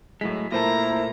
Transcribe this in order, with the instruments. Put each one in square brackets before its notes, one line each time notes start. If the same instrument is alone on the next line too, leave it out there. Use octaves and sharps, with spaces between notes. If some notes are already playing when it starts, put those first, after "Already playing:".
[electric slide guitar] A2 G#3 [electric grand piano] F#3 E4 B6
[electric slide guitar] A#2 A3 [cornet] E4 [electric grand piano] A#4 C5 A5 [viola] A#5